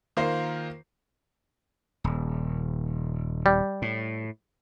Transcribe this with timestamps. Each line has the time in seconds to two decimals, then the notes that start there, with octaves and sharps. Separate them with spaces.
0.17 D#3 A#3 F4 A#4 C5 C7
2.04 D#1
3.46 G3
3.82 A2